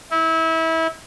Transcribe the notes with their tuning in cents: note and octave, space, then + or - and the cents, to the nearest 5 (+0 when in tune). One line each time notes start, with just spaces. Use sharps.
E4 -25